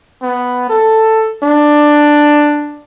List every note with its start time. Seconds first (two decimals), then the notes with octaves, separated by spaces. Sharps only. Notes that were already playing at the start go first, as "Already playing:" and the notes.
0.22 B3
0.69 A4
1.44 D4